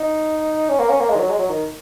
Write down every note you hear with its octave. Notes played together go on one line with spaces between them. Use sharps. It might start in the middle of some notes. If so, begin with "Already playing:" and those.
Already playing: D#4
C#4
A#3
C#4
A#3
G#3
D#3
F#3
G#3
F#3
D#3